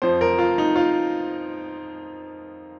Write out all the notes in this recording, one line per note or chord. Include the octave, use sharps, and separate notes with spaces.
F2 F3 C5
A#4
F4
D#4
F4